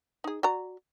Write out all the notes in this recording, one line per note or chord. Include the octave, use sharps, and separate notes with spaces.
D#4 G#4
F#4 D5 A#5